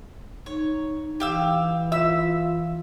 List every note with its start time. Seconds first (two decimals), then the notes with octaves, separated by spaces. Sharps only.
0.46 D#4 C#5
1.20 E3 G4 F5 E6
1.92 F4 E5 E6